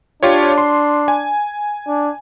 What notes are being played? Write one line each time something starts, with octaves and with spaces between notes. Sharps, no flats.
D4 F4 G4 C#5
C6
G#5
D4